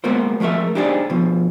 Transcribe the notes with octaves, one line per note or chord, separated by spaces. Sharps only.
G#3 A#3 B3 F#4 A#4 C5
F3 G#3 A3 A#4 E5
D4 D#4 G4 G#4 C5 D5
B2 F3